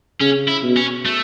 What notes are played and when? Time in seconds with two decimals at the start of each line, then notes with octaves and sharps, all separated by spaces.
0.20 C#3 C#4
0.48 E4
0.63 B2
0.77 C#4
1.06 A3